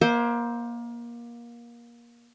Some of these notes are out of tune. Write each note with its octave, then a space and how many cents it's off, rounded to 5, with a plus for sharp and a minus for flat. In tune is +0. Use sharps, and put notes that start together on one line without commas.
A#3 +25 C5 +5 E5 -20